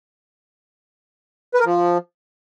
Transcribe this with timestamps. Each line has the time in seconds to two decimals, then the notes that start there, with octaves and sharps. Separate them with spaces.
1.54 B4
1.60 A#4
1.65 F3